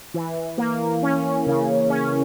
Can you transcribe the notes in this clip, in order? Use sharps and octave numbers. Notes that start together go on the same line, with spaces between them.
E3
A#3
C#4
C#3
C#4